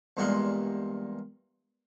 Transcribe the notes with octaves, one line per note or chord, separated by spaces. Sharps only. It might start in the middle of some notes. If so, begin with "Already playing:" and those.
E2 G2 A#2 G#3 F#5 C6